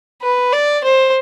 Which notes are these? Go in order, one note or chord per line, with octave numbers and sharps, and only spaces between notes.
B4
D5
C5